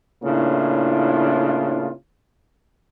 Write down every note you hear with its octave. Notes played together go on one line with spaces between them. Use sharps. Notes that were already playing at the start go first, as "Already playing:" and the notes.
A2 C#3 A#3 D4 E4 F4